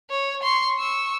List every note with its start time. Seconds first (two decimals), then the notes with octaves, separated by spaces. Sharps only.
0.10 C#5
0.43 C6 C#6
0.79 C#6 E6